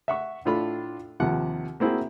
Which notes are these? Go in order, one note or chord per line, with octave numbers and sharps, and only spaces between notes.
E5 F#5 C#6
A2 D4 F4 A4 B5
D#2 C3 F3 F#5
A#3 C4 E4 F#4 G#4